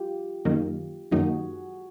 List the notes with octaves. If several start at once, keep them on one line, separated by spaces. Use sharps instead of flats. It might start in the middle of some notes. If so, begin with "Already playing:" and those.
Already playing: F4 G4
F#2 D#3 F#3 A#3 D#4
F#2 D#3 F#3 A#3 D#4 F#4 G#4